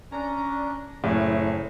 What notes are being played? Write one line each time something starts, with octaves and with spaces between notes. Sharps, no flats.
C#4 D4 A#5
F#1 A2